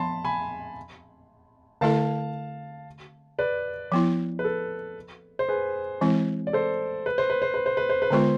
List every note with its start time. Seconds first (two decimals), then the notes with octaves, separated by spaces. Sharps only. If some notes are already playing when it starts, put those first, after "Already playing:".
Already playing: F3 B3 A5 B5 C6
0.25 G#5 B5
1.81 D3 A3 E4 A4 F5 A5
3.39 B4 D5
3.92 F3 B3 E4
4.39 B4
4.44 A4
5.39 C5
5.49 G#4 B4
6.01 E3 G#3 C4 E4
6.47 D5
6.53 A4 C5
7.06 B4
7.18 C5
7.30 B4
7.42 C5
7.54 B4
7.66 C5
7.77 B4
7.90 C5
8.02 B4
8.11 D3 G#3 B3 F4 C5